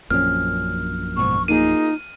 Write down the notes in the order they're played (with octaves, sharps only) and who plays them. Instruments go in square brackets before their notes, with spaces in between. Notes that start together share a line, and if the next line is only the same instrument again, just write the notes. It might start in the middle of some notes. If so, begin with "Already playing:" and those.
[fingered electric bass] A#1 F#2 A#2 [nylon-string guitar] C4 C#4 [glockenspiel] F6
[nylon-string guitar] G#2 B2 [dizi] C#6
[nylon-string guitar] A#3 F4 G#4 [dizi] D#4 [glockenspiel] D#7